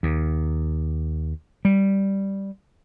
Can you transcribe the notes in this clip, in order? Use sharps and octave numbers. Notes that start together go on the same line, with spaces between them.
D#2
G3